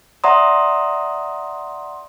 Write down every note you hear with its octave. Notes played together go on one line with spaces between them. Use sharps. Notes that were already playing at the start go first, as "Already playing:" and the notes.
D5 E5 F#5 A#5 C6 D#6